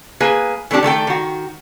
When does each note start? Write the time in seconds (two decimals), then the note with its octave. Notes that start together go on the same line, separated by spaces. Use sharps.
0.20 A#3 G#4 B4 G#5
0.71 E3 A3 C4 D4 G4
0.83 D#3 A3 A4 G5
1.07 D#3 F#4